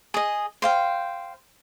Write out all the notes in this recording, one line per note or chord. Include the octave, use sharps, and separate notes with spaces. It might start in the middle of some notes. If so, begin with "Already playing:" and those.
G#4 D#5
C5 F5 G5